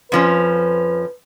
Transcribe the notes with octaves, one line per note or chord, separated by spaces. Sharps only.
F2 F3 C#4 B4